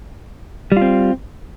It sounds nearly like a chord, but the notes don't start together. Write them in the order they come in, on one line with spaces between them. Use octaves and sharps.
G3 F4 C4